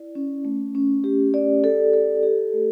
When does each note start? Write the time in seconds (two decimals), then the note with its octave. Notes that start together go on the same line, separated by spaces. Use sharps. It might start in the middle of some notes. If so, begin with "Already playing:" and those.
Already playing: E4 D5
0.15 C#4
0.45 A3
0.75 C#4
1.04 G4
1.34 D5
1.64 A4
1.93 A4
2.23 G4
2.53 A3